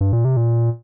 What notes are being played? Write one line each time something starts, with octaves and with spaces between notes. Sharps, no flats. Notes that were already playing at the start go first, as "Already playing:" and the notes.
G2
A#2
C3
A#2